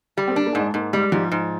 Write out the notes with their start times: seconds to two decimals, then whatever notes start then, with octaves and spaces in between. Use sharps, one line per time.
0.17 G3 G4
0.28 C4
0.31 A#3
0.36 D4
0.46 A#3
0.55 G#2 G#3
0.74 G#2 A#3
0.93 G3 G#3
1.12 G#2 F3
1.32 G#2